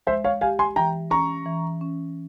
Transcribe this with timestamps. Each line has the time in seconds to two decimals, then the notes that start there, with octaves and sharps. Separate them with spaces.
0.07 G#3 C5 E5
0.24 C#5 F5
0.41 G4 F5 G#5
0.59 G#5 C6
0.76 E3 G5 A#5
1.10 C#4 A#5 C#6
1.46 E3
1.81 C#4